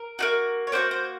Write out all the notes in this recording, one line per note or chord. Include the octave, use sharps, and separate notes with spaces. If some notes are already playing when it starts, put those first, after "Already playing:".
Already playing: A#4
A#3 D#4 F#4
C#5
A#3 D#4 F#4 C5
C5